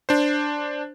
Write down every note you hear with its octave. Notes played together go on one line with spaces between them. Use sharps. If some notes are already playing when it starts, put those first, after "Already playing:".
D4 C5